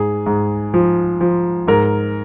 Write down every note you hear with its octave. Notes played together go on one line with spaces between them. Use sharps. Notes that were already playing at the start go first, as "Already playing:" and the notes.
Already playing: G#2 G#4
G#2
F3
F3
G#2 A#4